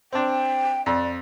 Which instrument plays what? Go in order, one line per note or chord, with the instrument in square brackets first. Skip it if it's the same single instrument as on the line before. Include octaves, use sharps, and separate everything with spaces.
[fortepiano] C4 D4 [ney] G5
[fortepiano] F2 [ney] D5